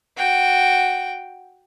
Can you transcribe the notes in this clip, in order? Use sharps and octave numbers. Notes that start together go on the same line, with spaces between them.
F#4 G5